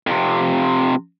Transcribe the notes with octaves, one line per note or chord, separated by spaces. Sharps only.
F2 C3